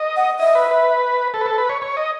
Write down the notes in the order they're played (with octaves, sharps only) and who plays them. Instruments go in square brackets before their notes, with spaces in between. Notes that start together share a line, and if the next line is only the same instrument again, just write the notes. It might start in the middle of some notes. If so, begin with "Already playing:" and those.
Already playing: [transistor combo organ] D#5
[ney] F#5
[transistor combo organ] D#5 [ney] E5
[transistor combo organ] B4
B4
A4
B4
A4
B4
C#5
C#5
D#5